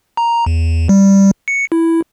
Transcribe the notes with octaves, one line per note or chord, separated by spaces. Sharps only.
A#5
E2
G3
C#7
E4